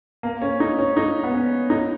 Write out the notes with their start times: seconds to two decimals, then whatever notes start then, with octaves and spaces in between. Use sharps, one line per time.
0.23 A#3
0.41 C#4
0.60 D#4
0.79 C#4
0.97 D#4
1.24 B3
1.34 C#4
1.70 D#4